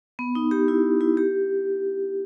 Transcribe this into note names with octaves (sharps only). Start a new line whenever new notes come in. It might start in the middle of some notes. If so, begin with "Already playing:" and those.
B3
D#4
G4
E4
E4
G4